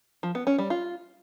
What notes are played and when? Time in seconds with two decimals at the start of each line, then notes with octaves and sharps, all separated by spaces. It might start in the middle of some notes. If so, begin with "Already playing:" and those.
0.23 F3
0.35 B3
0.47 C#4
0.58 G3
0.70 F4